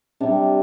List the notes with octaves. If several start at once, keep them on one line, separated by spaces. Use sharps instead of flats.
C3 G3 D4